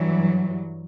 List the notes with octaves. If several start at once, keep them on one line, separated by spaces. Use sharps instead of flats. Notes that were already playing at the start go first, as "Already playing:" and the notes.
Already playing: G2 E3 F#3